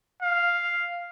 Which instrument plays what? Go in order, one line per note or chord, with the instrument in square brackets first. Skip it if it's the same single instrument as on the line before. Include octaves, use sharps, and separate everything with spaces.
[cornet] F5